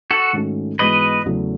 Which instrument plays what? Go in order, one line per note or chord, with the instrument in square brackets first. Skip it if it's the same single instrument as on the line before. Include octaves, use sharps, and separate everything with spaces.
[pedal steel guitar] F#4 A4
[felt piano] G#2 D#3 A3 C#4 F#4
[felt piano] G#2 E3 G#3 B3 F#4 [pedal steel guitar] B4 D#5
[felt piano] E2 C#3 F#3 A3